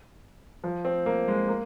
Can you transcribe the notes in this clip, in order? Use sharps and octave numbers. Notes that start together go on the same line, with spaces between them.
F3
C4
A#3
G#3
A#3